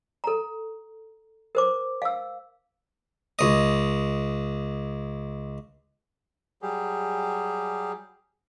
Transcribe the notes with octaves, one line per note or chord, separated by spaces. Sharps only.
A4 A#5
A#4 C5 D6
F5 E6
C#2 D#5
F#3 G3 G4 G#4